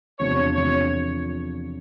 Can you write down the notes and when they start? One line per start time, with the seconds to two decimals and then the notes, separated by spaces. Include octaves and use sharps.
0.19 E2 C3 F3 A3 D4 C#5
0.55 E2 C3 F3 A3 D4 C#5